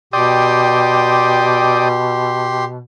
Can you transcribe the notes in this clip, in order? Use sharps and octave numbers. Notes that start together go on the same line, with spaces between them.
B2 G4 D5 G5 C6 D#6